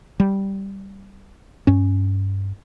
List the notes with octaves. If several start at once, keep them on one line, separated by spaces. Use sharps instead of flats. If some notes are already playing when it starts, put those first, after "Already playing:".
G3
G2 C#4